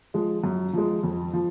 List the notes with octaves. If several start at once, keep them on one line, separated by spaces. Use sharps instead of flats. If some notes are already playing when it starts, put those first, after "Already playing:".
F3 G#3
F#2
F3 G#3
F2
F3